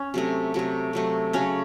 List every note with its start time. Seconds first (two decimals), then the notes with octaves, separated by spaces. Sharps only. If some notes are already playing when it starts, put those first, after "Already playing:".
Already playing: C#4
0.14 C3 F#3 A3
0.54 C3 F#3 A3
0.93 C3 F#3 A3
1.33 C#3 F#3 A3 C#4